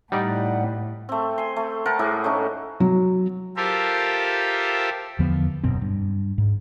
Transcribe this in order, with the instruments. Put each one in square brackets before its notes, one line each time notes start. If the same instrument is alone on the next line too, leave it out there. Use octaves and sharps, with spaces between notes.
[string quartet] A2 [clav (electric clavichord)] G3 D#4 D5 [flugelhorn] F#5
[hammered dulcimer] A3 C4
G#5 C6
A3
A#4 C5 F#5 A5
A2 E4 G#4 D6
A3 C#4 D#4
[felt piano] F#3
[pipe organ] F4 G4 A4 A#4 C5 E5
[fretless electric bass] E2 D3 F3 B3
D#1 F#2 B2 C4
G2
G#2